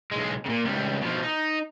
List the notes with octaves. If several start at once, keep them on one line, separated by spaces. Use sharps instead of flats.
B1 G#3
A#2 C#3
C#2 G3
B2 F3
D#4